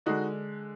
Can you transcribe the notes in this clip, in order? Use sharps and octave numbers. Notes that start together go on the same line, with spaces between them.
D3 G#3 D#4 F#4